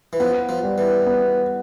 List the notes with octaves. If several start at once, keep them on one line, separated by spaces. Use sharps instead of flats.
E3
F3 B3
F3
G3
E3
B3